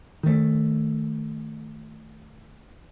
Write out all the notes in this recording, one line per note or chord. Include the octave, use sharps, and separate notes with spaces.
D#3 A3